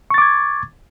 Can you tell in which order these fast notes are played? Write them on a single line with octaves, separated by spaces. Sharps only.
C#6 A6 D6 G#6